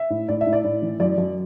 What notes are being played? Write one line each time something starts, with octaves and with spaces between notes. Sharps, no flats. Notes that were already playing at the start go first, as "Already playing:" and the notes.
Already playing: E5
A2
A2 D5
E5
A2
D5
A2
E3
F#2 D5
F#2